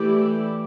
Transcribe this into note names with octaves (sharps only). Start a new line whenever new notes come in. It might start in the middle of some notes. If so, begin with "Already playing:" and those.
Already playing: E3 A3 E4 G4 D5